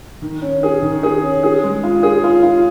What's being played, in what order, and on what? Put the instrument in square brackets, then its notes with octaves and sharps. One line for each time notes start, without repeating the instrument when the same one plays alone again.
[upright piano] D#3
C#4
G#4
D#3
G#4
C#4
G#4
G#3
F4
G#4
F4
F4